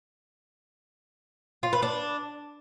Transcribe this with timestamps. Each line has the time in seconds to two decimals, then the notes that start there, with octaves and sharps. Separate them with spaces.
1.63 F4
1.73 B4
1.83 D4